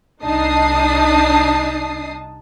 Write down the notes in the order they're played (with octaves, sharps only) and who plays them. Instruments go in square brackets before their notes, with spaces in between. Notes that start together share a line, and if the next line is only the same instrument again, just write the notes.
[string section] C2 D4 D#4 A5 D#6 C7